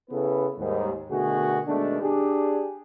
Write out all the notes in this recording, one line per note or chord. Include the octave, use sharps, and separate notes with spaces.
C#3 B3 E4 A4 B4
D#2 G#2 G3
B2 D3 D#3 A3 F#4 G#4
B2 D#3 G#3 A3 D4
D4 G4 G#4